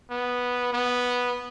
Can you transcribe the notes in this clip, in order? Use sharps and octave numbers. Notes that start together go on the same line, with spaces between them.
B3
B3